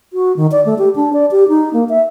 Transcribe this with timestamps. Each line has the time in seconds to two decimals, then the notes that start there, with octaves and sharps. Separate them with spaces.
0.13 F#4
0.37 D#3
0.52 D5
0.65 A3
0.78 G4
0.96 D4
1.13 D5
1.31 G4
1.48 D#4
1.73 A#3
1.89 E5